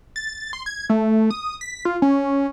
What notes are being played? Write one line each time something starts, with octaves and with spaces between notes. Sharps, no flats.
A6
C6
G#6
A3
D#6
B6
F4
C#4